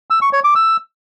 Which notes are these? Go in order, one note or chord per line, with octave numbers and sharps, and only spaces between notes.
E6
C#6
C#5
D6
E6